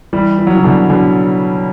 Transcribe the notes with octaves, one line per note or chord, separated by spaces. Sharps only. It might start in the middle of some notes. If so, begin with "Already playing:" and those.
E3 G3
E3
F#3
C#3 E3
B2 D3
B2 D3